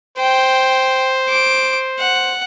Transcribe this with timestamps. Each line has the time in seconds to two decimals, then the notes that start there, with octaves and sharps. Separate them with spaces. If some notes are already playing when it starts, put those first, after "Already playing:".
0.18 C5 G5
1.29 D6
1.99 F#5